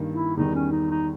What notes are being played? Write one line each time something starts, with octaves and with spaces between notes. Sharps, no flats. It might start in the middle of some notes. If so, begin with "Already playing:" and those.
Already playing: G2 D#3 A#3
E4
E2 D#3 G3 D#4
C#4
D#4
D#4